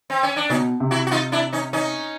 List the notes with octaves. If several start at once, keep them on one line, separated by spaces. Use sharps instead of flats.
C4
C#4
D4
B2 C#4 D#4
C3
E4 F#4
F#4
D#4 F4
D4 E4
C#4 D#4
C#4 D#4